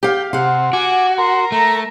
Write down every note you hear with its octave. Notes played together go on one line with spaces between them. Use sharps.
G4 F5 G5
C3 F5 F#5
F#4 G#5 D6
A#4 C6
A3 A#5